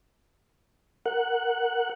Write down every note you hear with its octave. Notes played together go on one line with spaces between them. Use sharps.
A#4 F#5 F#6